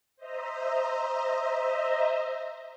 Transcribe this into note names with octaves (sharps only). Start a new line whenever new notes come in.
C5 D#5 E5 A#5